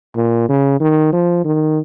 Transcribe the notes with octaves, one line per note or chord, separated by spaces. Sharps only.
A#2
C#3
D#3
F3
D#3